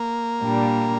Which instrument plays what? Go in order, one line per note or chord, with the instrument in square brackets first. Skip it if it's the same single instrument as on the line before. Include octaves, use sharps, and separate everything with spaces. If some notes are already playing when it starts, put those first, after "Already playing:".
Already playing: [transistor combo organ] A#3
[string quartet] A#2 G3 D4